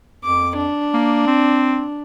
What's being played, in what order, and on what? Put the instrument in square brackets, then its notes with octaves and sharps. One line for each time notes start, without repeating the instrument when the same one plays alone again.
[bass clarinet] F2 [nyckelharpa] D6
[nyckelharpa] D4
[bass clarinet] A#3
C4